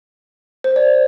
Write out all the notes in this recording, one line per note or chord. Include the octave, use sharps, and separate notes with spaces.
C5
D5